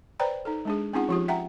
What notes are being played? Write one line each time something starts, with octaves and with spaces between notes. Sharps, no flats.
B4 C5 D5 G5 A#5 B5
D#4 A4
G#3 D4 G#4
C4 C#4 D#4 F4 G#4 F#5
F3 F4 G4
E5 F#5 G5 A#5